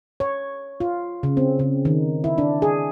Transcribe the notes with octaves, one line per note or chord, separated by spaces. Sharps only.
C#5
F4
C#3
C4
C#3
D#3
E4
D4
G#4